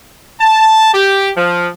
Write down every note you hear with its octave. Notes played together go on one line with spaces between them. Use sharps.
A5
G4
F3